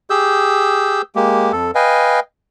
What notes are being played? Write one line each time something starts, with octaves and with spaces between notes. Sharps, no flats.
G4 G#4 E6 G6
G#3 A#3 G4
F2 A4
B4 D#5 F5 G5 G#5